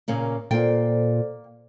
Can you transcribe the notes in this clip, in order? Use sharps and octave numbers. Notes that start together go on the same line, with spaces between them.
A#2 C#3 A#3
A#2 A#3 A4 C5 D5 G5